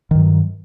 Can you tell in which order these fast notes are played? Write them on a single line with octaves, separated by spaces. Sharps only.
D#3 G2 F#3